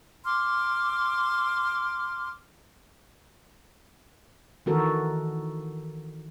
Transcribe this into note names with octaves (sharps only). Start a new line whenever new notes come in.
C6 D6 F6
D#3 E3 F#4 A4 A#4